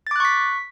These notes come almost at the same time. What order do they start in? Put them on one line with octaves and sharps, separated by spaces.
A6 D6 F#6 C#6 B6